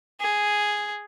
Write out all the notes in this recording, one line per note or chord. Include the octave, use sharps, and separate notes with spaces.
G#4